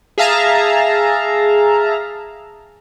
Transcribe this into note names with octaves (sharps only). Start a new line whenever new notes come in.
G#4 E5 F5 A5 A#5